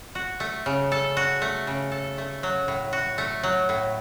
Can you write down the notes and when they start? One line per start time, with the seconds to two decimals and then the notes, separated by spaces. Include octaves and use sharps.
0.15 F#4
0.40 A3
0.66 C#3
0.92 A4
1.17 F#4
1.42 A3
1.67 C#3
1.92 A4
2.18 A3
2.43 F#3
2.68 A2
2.93 F#4
3.18 A3
3.43 F#3
3.69 A2